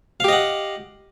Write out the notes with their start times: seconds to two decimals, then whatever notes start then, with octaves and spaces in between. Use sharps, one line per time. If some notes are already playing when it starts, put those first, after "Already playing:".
0.20 F5
0.24 G4
0.28 D#5
0.33 F#5